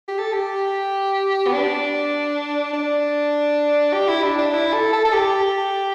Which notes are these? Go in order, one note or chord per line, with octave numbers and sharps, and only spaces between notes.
G4
A4
G4
B3
D4
D4
G4
E4
D4
D4
E4
A4
A4
A4
G4